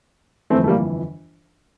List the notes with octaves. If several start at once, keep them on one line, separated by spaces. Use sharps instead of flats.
G1 F2 E3 A3 C4
A3
G3 A#3